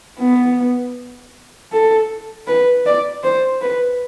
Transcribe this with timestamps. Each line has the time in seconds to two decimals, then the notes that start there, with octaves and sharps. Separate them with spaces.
0.19 B3
1.72 A4
2.47 B4
2.86 D5
3.23 C5
3.61 B4